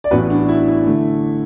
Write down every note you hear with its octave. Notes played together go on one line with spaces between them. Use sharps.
D5
A1 A2 E3 B3 F#4 B4
D4 F#4
E4
E4
D3 A3